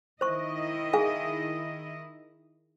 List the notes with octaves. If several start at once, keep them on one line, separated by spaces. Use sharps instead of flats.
D#3 E4 C5 D#5 C#6
G#4 F5 G#5